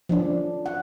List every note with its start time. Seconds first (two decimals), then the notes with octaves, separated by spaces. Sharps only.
0.09 F3 C#4 D4
0.66 F#5